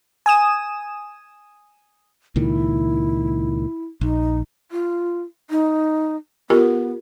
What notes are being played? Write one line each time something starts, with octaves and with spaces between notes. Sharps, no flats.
G#5 D#6 E7
C#2 A#2 D#3 E4
A#1 D#4
F4
D#4
B3 F4 G4 A#4